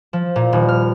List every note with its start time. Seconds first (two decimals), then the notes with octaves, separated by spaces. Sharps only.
0.13 F3
0.36 A#2
0.53 D#1
0.69 F6